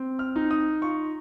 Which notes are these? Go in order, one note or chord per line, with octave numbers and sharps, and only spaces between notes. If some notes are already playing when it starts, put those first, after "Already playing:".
Already playing: C4
F6
D#4
D#6
F4 C#6